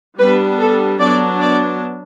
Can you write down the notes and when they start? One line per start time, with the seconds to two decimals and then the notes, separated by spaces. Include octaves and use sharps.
0.19 G3 B3 D4 B4
0.59 A4
1.00 F#3 B3 D4 D5
1.41 D5